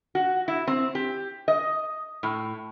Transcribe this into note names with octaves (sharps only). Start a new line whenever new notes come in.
F#4
E4
C4
G4
D#5
A2